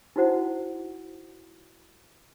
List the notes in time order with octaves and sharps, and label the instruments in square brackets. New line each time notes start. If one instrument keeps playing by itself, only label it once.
[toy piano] D#4 E4 F#4 C5 F#5